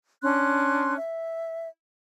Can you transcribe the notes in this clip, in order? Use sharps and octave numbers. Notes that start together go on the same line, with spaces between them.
C#4 D4 C6 F#6
E5